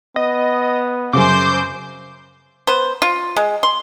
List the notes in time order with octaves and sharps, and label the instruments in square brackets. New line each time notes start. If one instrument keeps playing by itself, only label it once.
[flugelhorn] B3 [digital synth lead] D#5
[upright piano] F#2 C#3 [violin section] C5 G6 [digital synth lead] D6
[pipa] B3 C5
F4
G#3
C6